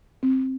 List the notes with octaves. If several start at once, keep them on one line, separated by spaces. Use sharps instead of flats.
C4